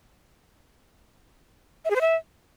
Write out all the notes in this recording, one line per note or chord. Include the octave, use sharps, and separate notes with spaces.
E5
G#4
C5
E5